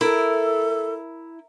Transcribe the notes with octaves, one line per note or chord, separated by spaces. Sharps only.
E4 A4 A#4